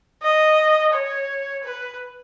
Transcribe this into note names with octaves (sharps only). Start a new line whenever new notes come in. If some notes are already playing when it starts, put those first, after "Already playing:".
D#5
C#5
B4